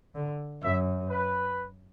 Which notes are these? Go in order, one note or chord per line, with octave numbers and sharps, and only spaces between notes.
D3
F#2 E5
B4